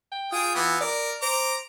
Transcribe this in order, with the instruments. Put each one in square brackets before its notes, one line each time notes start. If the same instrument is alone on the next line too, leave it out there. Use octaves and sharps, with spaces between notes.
[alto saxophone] G5
[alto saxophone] F4 [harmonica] G#4 G5 D#6
[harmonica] E3 B3
[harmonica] A#4 [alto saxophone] D5
[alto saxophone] C5 [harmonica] A#5 D6